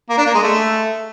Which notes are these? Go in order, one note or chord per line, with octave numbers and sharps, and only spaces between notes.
A#3
D4
A#3
G#3
A3